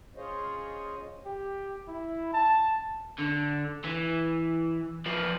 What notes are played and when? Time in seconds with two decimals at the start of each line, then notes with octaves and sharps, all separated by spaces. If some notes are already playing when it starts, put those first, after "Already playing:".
0.16 C#4 F4 G#4 C5 C#5 D#5
1.25 G4
1.88 E4
2.33 A5
3.19 D3
3.84 E3
5.06 F3 B4